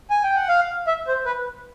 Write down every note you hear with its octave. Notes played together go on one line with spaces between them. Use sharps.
G#5
G5
F#5
F5
E5
C5
B4